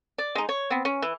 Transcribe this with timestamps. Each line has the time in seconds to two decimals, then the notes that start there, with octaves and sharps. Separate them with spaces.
0.18 D5
0.35 G#3 D#4
0.49 C#5
0.70 B3 C4
0.85 C#4
1.02 E3